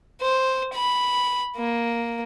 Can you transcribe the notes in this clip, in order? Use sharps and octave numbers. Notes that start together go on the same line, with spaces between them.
C5
B5
A#3